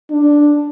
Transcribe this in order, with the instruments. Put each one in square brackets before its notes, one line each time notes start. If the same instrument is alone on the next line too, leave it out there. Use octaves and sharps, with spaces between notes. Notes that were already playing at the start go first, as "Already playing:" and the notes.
[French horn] D4